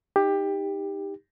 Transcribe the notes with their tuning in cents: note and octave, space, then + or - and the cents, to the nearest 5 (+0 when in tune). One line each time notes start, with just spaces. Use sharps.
D#4 +0 G4 +15